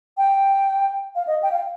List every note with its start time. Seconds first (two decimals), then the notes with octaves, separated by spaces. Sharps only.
0.18 G5
1.15 F5
1.27 D#5
1.42 G5
1.51 F5